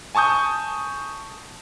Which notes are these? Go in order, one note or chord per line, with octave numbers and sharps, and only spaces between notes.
G#5 A5 C#6 D#6 G6